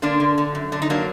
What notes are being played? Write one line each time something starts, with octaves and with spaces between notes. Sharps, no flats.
D3 A#3 D4
D3
D3
F#2
D3 D4
D#4
F#3 A#3 D4